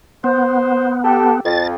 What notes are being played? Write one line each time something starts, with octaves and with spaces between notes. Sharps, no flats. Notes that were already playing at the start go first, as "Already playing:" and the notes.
B3 C5
G4 A4
F2 A6